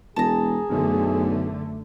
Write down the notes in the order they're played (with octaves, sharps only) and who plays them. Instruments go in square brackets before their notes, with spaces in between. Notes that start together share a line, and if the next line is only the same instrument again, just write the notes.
[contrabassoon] E1 [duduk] G#4 [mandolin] A5 A#5
[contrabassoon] B1 [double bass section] F#2 D3 A3